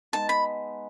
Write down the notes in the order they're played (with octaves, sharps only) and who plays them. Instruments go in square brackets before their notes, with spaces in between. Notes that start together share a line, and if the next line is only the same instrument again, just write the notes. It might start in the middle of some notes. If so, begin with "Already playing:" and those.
[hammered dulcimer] G#3 B3 D#4 [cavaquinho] A5
[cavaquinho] B5